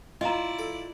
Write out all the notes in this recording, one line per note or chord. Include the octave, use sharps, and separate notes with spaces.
E4 F4 D5 D#5 A#5
A4